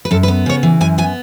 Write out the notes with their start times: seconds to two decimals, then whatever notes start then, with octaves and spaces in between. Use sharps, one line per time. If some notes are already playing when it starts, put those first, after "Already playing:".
0.05 B4
0.11 F#2 A4
0.23 B4
0.28 B3
0.46 C#3 C#5
0.63 E3
0.81 F#2 G#5
0.98 B3 G#5